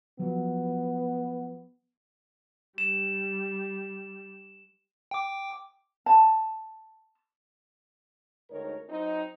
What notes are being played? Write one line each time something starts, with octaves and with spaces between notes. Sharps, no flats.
F3 F#3 B3
G3 E7
G5 D6
A5
D2 G#2 D#4 A#4 C#5
F#3 C4 D#4